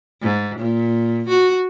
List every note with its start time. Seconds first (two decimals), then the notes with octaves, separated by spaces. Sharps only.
0.22 G#2
0.59 A#2
1.29 F#4